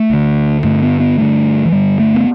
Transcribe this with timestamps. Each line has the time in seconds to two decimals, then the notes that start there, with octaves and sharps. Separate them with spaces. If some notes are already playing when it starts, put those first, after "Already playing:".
Already playing: A3
0.10 D2 D3
0.64 G2 D3 A3
0.82 B3
1.00 B3
1.18 G2 D3 A3
1.66 E3
1.71 G2 D3 G3
2.00 A3
2.15 B3